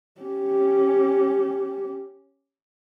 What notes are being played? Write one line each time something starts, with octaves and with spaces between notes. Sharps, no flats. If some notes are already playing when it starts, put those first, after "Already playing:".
C#4 G4